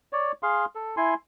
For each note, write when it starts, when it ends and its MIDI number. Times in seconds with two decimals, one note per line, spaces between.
0.13 0.32 73
0.13 0.32 74
0.43 0.65 68
0.43 0.65 77
0.43 0.65 84
0.75 0.95 69
0.97 1.14 64
0.97 1.14 80
0.97 1.14 84